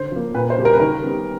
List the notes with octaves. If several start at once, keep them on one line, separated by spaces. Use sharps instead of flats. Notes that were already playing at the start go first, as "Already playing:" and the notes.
Already playing: D3 C5
F3 A#3
A#2 B4
C5
G3 A#3
A#4
B4
D#3 A#4
G3 B3